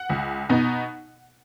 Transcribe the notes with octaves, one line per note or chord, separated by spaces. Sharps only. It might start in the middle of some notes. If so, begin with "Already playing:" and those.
Already playing: F#5
C#2
B2 B3 D#4